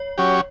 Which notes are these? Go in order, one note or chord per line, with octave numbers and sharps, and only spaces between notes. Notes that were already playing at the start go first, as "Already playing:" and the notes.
Already playing: C#5
F#3 C#4 G4